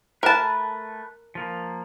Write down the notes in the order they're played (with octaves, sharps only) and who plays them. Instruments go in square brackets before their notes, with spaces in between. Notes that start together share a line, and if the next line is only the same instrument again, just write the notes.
[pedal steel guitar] A3 B4 [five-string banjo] A#4 A5
[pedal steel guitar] F3 A#3